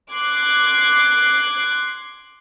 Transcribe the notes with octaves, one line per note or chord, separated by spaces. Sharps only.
C6 D6 F#6 G#6 C7